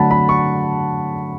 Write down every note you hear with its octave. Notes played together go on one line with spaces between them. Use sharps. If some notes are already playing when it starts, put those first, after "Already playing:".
Already playing: D3 F#3 A3 F#5 A5 B5
B5
C#6